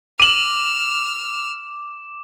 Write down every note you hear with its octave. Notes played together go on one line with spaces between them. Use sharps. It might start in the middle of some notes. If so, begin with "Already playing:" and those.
D6 E6 F6 D#7 E7 F#7